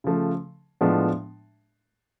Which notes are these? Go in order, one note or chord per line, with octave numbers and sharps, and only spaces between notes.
C#3 F3 A3
A2 F3 G#3 B3 D4